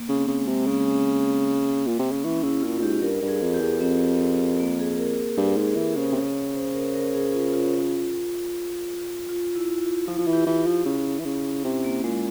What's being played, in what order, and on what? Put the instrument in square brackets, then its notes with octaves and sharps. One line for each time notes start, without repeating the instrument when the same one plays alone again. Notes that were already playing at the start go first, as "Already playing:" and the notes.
Already playing: [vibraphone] A#3
[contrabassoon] C#3
[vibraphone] C4
[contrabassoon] C#3
[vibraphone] G#3
[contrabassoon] C3
[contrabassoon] C#3 [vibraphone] A#3
[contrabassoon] A#2
C3
C#3
[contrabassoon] E3 [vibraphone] C#4
[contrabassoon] C#3 [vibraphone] E4
[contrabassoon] A#2 [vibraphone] F4
[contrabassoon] A#2
[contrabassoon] G#2 [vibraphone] G4
[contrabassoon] G2 [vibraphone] A#4
[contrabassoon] G2
[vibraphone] G#4
[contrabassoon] F2
[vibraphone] G4
[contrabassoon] E2
[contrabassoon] F2 [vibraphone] C4
[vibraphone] A#3
G#4
A#4
[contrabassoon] G2 [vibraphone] G4
[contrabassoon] G#2 [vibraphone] G#4
[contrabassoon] E3 [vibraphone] A#4
[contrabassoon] C#3 [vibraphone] C5
[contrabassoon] C3
[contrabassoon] C#3 [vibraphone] C#5
[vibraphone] C#5
C5
A#4
A#4
G#4
F4
F4
F4
E4
F4
[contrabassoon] F3 [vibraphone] F4
[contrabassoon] F3
E3
[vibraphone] G4
[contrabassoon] E3
[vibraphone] E4
[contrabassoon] F3
C#3
E3
C#3
[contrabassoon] C3 [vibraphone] C#4
[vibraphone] A#3
[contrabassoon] A#2 [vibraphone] G#3